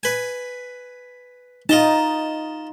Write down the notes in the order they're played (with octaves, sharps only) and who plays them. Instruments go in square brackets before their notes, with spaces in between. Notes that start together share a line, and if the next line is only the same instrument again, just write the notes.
[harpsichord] B4 G#5
[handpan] D#4 [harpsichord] F4 D#5 A5